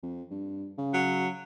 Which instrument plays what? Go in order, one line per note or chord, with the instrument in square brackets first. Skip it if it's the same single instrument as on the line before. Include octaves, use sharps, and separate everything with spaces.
[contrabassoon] F2
G2
C#3
[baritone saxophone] F#3